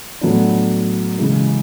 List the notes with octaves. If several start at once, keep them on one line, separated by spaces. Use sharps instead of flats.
A2 F#3 B3 D4
C#3 E3 G#3